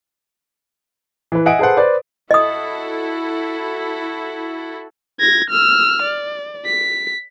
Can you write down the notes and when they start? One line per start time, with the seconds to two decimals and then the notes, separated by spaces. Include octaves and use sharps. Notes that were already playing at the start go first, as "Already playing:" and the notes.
1.32 E3 B4
1.46 D#5 E5 F#5 G#5 D#6 D7
1.59 G#4 A4 B4 C5 F#5
1.77 B4 C5 D5
2.31 E4 F#4 A4 D#5 D#6
5.20 G#6 A#6
5.50 E6 F6
6.03 D5
6.66 B6